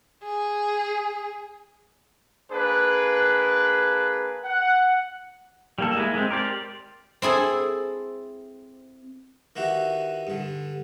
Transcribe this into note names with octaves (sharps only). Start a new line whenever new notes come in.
G#4
A#3 D4 G#4 B4
F#5
G3 A#3 A4
G#3 A#3 E4
G#3 C4
G4 A#4 C5 D5
C4 E4 G#4 A4
D#3 E3 E4 F#4 G4
G2 D3